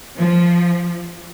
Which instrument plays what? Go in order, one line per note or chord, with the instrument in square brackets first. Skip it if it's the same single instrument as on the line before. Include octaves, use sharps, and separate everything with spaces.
[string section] F3